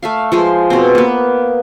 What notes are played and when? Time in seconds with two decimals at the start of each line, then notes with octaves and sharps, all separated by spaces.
0.03 A3 E5 F5
0.32 F3 G#3 C5
0.70 B2 C4
0.95 A#3 B3